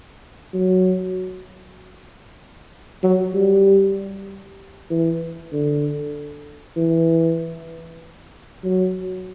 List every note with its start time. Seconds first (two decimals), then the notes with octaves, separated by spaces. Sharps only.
0.54 F#3
3.03 F#3
3.34 G3
4.90 E3
5.52 D3
6.77 E3
8.64 F#3